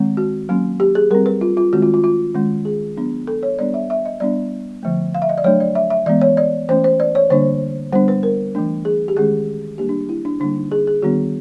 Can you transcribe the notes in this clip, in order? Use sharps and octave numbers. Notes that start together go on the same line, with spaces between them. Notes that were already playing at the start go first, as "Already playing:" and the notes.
Already playing: D#3 G#3 C4
F#4
F#3 A#3 C#4
G4
G#4
G3 C4 A#4
B4
F4
F4
D#3 G#3 C4 F#4
F4
F4
F4
D#3 G#3 C#4
G#4
F#3 B3 D4
A4
C#5
G3 B3 D4 D5
E5
E5
D#5
G3 B3 D4 D5
D3 F3 A3
F5
E5
D#5
D5
F#3 A3 D4 C#5
D5
E5
E5
E3 G#3 B3 D5
C#5
D5
E3 A3 C#4 C5
C5
D5
C#5
D3 G3 A#3 D4 C5
G3 B3 D4 C5
B4
A#4
E3 A3 D4
G#4
G4
D#3 G#3 C#4 G#4
G3 A#3 D4 G4
D4
E4
D4
D3 G3 A#3 D4
D#4
G#4
G#4
D#3 G3 B3 D4 F#4